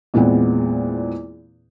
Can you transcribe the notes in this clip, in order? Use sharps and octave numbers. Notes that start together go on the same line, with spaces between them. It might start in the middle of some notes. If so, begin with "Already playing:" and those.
E2 A#2 G#3 B3 C4